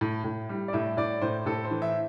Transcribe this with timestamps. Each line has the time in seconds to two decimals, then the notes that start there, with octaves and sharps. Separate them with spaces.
0.01 A2
0.24 A2
0.49 G3
0.68 D5
0.73 A2 E5
0.97 A2 D5
1.22 A2 C5
1.46 A2 A4
1.65 C5
1.71 E3
1.82 E5